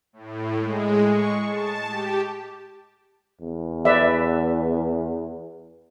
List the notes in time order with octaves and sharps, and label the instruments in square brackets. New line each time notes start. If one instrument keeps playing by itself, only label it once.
[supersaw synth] A2
G#3
C#6
A5
G4
[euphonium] E2
[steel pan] B4 D5 E5